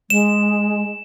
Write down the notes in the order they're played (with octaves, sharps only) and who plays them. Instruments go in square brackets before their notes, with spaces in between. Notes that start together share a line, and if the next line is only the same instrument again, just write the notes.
[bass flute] G#3 [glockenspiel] E7